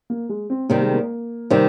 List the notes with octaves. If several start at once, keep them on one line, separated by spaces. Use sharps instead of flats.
A#3
G#3
C4
C3 D#3 G3 A#3
G#3
A#3
C3 D#3 G3